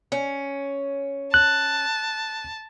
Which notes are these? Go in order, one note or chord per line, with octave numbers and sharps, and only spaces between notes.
C#4
A5 F#6